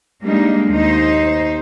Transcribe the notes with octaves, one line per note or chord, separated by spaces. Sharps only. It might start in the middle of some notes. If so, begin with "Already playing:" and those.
G3 G#3 A#3 D4 D#4
D#2 D#4 C5